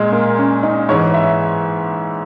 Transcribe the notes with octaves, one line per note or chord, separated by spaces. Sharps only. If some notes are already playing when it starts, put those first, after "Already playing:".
Already playing: A#2 G#3
A#3
C#4
D#4
G#2 E3 C#5
E5